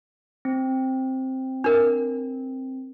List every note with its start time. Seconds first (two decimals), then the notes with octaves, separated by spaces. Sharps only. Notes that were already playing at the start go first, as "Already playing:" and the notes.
0.45 C4
1.64 D4 A#4